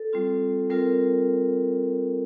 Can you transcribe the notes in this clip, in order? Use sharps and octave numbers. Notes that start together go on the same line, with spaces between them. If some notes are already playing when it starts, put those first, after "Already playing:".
Already playing: A4
G3 C4 F4
G3 C4 F4 A#4